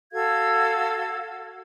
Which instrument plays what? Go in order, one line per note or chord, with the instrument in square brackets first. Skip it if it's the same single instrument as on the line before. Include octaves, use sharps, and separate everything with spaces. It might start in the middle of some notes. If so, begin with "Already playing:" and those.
[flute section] F#4 A4 F5 G#6